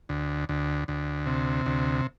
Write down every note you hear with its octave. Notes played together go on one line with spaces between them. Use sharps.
D2
D2
D2
C3
D2